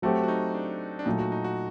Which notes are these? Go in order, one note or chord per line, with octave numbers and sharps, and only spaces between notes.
F#3 A3 C4 F#4 G4
F#4
D#4
D4
D4
A#2 F#3 A3 D#4
F#4
D#4
F#4